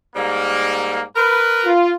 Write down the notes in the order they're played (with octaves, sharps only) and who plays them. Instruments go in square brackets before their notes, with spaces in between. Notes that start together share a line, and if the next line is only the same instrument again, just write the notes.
[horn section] G#2 G3 A#3
A#4 B4
[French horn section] F4